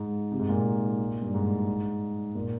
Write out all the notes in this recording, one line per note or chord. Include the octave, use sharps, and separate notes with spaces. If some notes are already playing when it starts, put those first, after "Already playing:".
Already playing: G#2
C3
G#2
A#2
G2
G#2
A#2